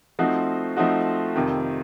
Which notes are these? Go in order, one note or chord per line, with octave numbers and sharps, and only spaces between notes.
F3 A3 C4 D#4 F#4
F3 A3 C4 D#4 F#4
F2 C3 D#3